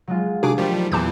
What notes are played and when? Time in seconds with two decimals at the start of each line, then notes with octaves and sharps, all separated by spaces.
0.07 F#3 G#3 F4
0.43 C3 D4 F#4 G#4 D6
0.58 D#3 F3 G3 A3 G4
0.92 E2 A#2 E3 A5 D6 G6